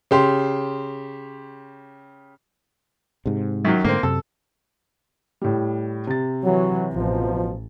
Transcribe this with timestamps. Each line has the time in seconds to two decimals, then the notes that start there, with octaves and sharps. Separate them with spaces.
0.11 C#3 G4 C6
3.26 G#2 C3
3.65 F#2 D#3 F#3
3.84 G#2 D3 A3 A#3 C4
4.03 F#2 C3 A4
5.42 A2 G3
6.07 C3 A6
6.44 E3 F#3
6.93 A1 B2 F3